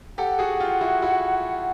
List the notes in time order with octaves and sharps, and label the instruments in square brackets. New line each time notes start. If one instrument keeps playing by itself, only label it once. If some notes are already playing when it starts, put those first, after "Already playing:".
[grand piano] G4 A4 [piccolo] F#5
[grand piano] F#4 G#4
F4 G4
E4 F#4
E4 F#4